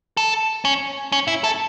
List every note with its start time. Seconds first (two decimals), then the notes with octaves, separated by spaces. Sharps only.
0.17 A4
0.65 C#4
1.12 C#4
1.27 E4
1.44 A4